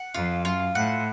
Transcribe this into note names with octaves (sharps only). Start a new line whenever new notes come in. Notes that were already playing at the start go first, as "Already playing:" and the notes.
Already playing: F#5
F2 F4
F#2 F4
A2 F#5